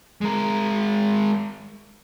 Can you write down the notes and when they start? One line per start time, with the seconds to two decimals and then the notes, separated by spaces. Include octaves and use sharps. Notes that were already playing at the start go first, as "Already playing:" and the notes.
0.21 G#3 A#4